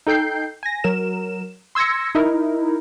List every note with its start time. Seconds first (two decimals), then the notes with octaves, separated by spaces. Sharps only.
0.07 D#4 A4 G5 G6 C7
0.63 G#5 A#6
0.84 F#3 A#4 E7
1.75 C6 E6 G#6 A#6 C#7
2.15 D#4 E4 A#4